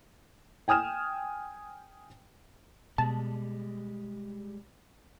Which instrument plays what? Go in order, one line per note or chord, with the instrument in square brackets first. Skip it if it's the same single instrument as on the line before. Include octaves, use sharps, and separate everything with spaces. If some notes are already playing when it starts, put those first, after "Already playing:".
[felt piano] G5 G#5 D#6 F6 E7
[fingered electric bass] B2 [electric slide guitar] G3 G#3 [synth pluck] A5